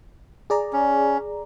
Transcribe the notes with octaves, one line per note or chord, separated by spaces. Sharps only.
G#4 D5 A#5
C#4